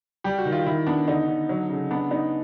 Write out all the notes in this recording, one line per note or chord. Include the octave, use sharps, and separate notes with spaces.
G3 G4
F#4
D#3
F4
D#3 E4
B3 D4
D3 D#4
D3
F#3
C#3
B3 D4
B3 D#4